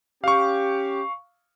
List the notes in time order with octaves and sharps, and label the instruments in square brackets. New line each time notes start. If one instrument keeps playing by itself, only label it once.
[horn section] C#4 G4 [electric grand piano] F5 C#6